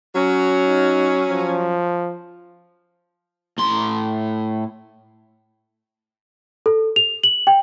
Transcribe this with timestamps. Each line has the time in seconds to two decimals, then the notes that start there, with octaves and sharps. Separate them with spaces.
0.15 F#3 C#4
0.66 D#4
1.30 F3
3.58 A2 C6
6.66 A4
6.96 F7
7.24 F#7
7.47 G5